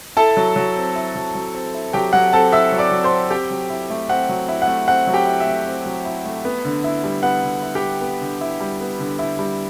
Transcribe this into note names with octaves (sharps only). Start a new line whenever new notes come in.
E4 A4 A5
F#3
F#3
C4
E4
F#3
F#3
C4
E4
F#3 G4 G5
F#3 F#5
C4 A4 A5
E4 E5 E6
F#3
D5 D6
F#3
C5 C6
C4
C4 G4 G5
F#3
E4
A3
C4 F#5
F#3
E4
F#5
A3
C4 F#5
F#3
G4 G5
E4
E5
A3
C4
F#3
E4
A3
B3
D3
E4
G3
B3 F#5
D3
E4
G4 G5
G3
B3
D3
E4
G3
B3
D3
E4
G3